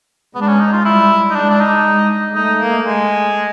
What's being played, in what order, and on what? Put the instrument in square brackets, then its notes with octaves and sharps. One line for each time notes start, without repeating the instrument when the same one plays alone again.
[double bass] G#3 [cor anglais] B3
[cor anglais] D4
C#4
D#4
F4
[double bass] G3 [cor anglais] E4
[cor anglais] D#4
[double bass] G#3 [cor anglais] D4
[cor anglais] D4
D#4
[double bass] G#3
[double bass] A3 [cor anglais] D#4
[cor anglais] A#3
G#3